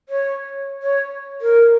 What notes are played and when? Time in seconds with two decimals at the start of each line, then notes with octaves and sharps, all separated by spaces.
0.09 C#5
0.82 C#5
1.41 A#4